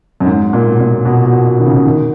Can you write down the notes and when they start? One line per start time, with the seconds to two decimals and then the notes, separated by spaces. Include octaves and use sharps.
0.20 F#2
0.26 G#2
0.53 A#2
0.69 B2
0.80 A#2
1.05 B2
1.26 B2
1.60 D#3
1.66 C#3
1.85 D#3